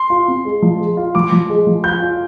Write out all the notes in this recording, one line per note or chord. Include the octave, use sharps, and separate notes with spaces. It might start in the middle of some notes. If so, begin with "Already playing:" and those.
Already playing: C6
F4
C4
G#3
F3
G#3
F4
F3 D6
F3
G#3
F3
F4 G6
F4